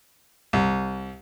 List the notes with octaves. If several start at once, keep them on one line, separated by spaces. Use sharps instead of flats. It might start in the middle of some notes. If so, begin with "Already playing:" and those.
C2